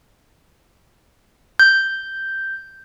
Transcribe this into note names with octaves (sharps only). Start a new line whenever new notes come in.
G6